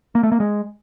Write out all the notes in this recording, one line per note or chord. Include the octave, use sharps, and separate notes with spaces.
A#3
A3
A#3
G#3